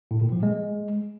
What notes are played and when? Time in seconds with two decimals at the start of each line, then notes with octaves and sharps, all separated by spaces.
0.11 A2
0.22 A#2
0.32 F3
0.43 G#3